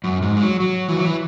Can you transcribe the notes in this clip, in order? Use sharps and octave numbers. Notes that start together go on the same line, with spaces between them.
F#2
G#2
G#3
F#3
F#3
E3
F#3
E3